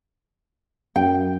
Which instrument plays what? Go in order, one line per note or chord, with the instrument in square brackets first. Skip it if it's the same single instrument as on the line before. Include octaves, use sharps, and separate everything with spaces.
[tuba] F#2 [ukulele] G5